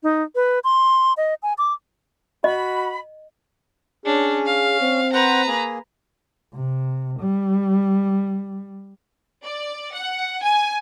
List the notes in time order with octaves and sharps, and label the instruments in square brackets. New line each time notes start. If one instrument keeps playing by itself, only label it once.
[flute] D#4
B4
C6
D#5
G#5
D6
[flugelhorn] F#4 [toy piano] D#5 [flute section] B5
[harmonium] C#4 [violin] D4 C#5 [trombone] G#4
[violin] F5
[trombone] C4
[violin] B4 A#5 [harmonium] C5 F#5
[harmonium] A#3 G#4
[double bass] C3
G3
[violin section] D5
F#5
G#5